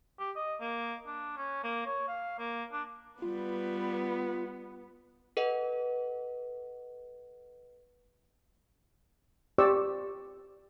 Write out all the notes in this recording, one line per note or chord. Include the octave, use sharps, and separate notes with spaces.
G4
D#5
A#3
D4
C#4
A#3
C#5
F5
A#3
D4
G3 B3 F4 B4
A4 B4 D#5 F#5
G4 C5 D5 C#6 E6